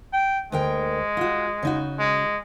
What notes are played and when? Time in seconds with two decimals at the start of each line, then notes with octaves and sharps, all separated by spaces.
0.13 G5
0.52 D2 G#3 A#4 G5
1.17 F4 F#4
1.63 C#3 D#4 F#4
1.99 G#3